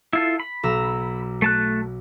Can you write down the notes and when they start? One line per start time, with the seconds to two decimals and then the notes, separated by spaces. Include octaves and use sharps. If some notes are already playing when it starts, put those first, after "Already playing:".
0.13 E4 F4 A4
0.40 B5
0.63 B1 A#5 E6
1.42 A3 A5 F#6